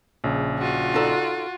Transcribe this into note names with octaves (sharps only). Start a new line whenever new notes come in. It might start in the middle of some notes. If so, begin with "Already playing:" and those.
A#1 C#3
F4 F#4
D#4 A4 D5